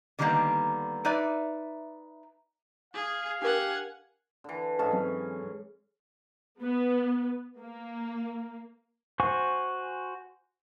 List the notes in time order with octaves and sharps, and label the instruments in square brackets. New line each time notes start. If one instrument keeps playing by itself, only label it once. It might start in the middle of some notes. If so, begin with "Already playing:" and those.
[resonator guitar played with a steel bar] D3 D#3 G3 G#3 A#3 B3
D#4 B4 D5 E5
[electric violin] G#4 [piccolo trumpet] F5
[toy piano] D4 A#4 [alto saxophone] G4 [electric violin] F#5 G#5
[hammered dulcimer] D3 E3
[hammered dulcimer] G#2 C#4 [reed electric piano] A4 A5 [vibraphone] D#5 F5
[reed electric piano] F#3 C4 [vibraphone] A4
[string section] B3
A#3
[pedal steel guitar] F#4 C5 G#5 C#6